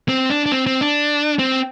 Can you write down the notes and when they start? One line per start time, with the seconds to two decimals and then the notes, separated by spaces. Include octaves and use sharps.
0.09 C4
0.30 D4
0.46 D4
0.52 C4
0.66 C4
0.81 D4
1.39 C4